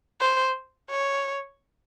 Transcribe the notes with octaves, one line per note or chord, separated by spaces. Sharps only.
C5
C#5